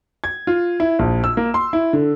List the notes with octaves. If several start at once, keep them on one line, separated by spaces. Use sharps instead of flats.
G#6
F4
E4
A#1
E6
A#3
C6
E4
D3